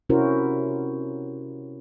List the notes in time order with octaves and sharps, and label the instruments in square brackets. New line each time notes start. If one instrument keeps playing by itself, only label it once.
[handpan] C3 C#4 E4 F#4 A#4 C5